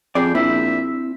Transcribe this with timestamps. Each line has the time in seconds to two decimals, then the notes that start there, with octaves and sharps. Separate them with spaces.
0.15 F2 G#4 D5 G5
0.35 A#1 C4 E4 E5 B5